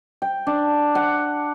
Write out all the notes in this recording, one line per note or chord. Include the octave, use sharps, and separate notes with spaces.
G5
D4
F#5